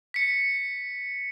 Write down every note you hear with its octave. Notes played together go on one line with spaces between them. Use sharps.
B6 C#7